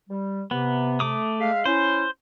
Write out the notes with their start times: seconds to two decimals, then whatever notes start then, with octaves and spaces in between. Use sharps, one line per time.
0.10 G3
0.51 C3 B3
1.00 A3 D6 D#6
1.40 G#3 E5 F5
1.65 C#4 E4 C5